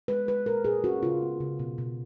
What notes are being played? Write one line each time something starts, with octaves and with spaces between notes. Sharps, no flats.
G#3 B4
G#3 B4
A#2 A#4
A#2 G#4
C#4 F#4
C#3 F4
B3
C#3
B2
B2